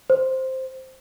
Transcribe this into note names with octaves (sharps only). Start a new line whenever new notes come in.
C5